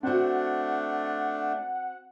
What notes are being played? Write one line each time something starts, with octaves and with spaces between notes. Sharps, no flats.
A3 C4 D4 F#4 F#5